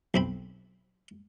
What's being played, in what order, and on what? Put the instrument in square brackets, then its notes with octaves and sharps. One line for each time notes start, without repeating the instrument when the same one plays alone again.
[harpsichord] B1 C4 B5